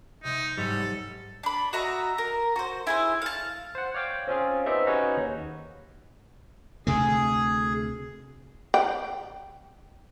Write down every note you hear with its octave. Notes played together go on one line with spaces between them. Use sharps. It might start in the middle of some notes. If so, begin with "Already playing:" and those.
C3 G#3 D#4
G#2 F#3 G3 A4 G#5
D4 B5
F#4 D#5 E5 A#5
A#4
F#4 C5
E4 G#4 C5
F5 A5
C5 F#5
C#5 D5 F5 G5 D6
C4 C#4 F4 G#4
B3 C4 D#4 G4 E5
C#4 D#4 F#4 G#4 B4 C#5
D#2
D2 C3 A3 G#4
G5